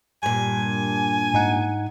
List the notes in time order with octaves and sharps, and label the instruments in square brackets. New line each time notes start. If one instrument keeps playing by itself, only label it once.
[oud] G2 A#2 [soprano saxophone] G#5
[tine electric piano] G#2 D#4 F#5